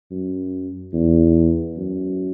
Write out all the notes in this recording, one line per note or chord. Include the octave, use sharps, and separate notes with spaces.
F#2
E2
F#2